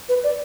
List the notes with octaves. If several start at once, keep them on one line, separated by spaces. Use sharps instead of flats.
B4
D5